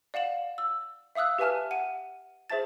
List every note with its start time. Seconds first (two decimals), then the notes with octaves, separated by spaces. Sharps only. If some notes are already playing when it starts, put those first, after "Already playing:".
0.14 D5 F5 F#5 E7 F#7
0.58 E6
1.15 E5 F5 D#6 E6 F#6
1.38 G4 B4 E5 G#5 A5 F6
1.71 F#5 D#7
2.50 G#4 C5 E5 A5 A6